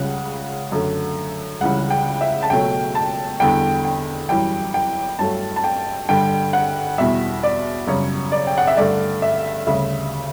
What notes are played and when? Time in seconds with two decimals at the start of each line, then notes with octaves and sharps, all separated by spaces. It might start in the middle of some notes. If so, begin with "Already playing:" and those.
Already playing: C#2 C#3 G3 F#5
0.72 F#2 D3 A3
1.61 C#2 C#3 E3 G3 F#5
1.90 G5
2.21 E5
2.43 A5
2.50 C#2 B2 F#3 A3 G5
2.95 A5
3.40 E2 D3 G3 G5
3.85 G5
4.29 F#2 E3 G3 G5
4.74 G5
5.19 G2 F#3 A3 A5
5.56 A5
5.64 G5
6.09 G2 D3 G3 G5
6.53 F#5
6.98 E2 B2 G3 E5
7.43 D5
7.87 F#2 C#3 G3 C#5
8.32 D5
8.47 G5
8.58 F#5
8.67 E5
8.77 G2 D3 A3 D5
9.22 E5
9.67 D2 C#3 G3 E5